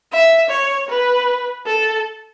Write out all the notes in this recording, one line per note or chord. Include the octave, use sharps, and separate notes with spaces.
E5
C#5
B4
A4